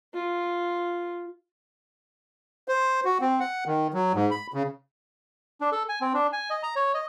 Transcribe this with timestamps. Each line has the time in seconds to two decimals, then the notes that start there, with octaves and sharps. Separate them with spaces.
0.14 F4
2.68 C5
3.05 F#4
3.21 C4
3.40 F#5
3.66 D#3
3.94 F#3
4.14 G#2
4.31 B5
4.54 C#3
5.61 D4
5.72 A4
5.89 G#5
6.01 C4
6.14 D4
6.33 G#5
6.50 D#5
6.63 A#5
6.76 C#5
6.94 D#5